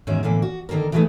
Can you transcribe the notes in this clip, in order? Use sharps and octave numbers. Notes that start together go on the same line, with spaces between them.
E2 G#2 D#3 C#4 F#4 E5
A2 D3 E3 A#3
F#4
D3 D#3 A#3 A4 A#4
E3 F#3 G#3 A3 B3 D#4